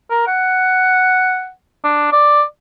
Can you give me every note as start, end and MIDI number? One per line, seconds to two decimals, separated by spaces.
0.11 0.23 70
0.27 1.50 78
1.84 2.09 62
2.12 2.43 74